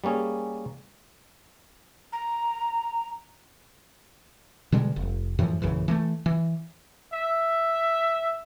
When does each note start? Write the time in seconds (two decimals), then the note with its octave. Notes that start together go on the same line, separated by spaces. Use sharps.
0.04 G3 A#3 C#4 G#4
2.13 A#5
4.72 B2 D3 G3 G#3
4.96 F1
5.39 F#2 A2 E3 F3
5.62 A#1 F#2 C#3 E3
5.88 E3 G#3 A3
6.26 E3
7.13 E5